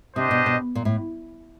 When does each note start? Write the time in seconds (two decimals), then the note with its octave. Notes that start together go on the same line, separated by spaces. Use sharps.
0.16 C3 D4 G4 C5 D#5
0.31 B2
0.46 B2
0.75 A#2
0.85 A2